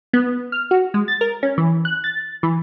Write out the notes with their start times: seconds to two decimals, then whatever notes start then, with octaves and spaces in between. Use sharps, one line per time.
0.13 B3
0.52 F6
0.71 F#4
0.94 G#3
1.08 A6
1.21 A#4
1.43 C#4
1.58 E3
1.85 F#6
2.04 A6
2.43 E3